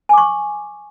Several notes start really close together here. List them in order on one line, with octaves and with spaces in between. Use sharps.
G#5 D6 C#6